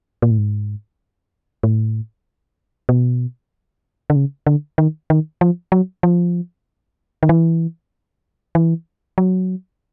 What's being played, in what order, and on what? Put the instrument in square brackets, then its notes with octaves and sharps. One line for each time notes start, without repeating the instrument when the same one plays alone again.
[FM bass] A#2
A2
G#2
A2
B2
D3
C#3
D3
D#3
D#3
F3
F#3
F3
D#3
E3
E3
F#3